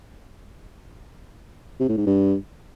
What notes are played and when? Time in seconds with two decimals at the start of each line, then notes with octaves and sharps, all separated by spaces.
1.80 C3
1.89 A2
1.98 G#2
2.06 G2